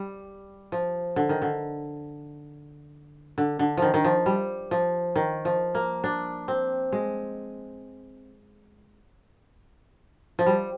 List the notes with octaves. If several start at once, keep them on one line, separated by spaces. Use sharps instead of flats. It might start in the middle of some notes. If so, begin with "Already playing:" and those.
Already playing: G3
F3
D3
D#3
D3
D3
D3
D#3 F3
D#3
F3
G3
F3
D#3
F3
A#3
D4
C4
G#3
F3
G3